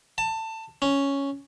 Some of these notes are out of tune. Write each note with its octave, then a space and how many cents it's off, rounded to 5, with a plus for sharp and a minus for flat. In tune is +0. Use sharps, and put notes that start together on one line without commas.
A5 +20
C#4 +0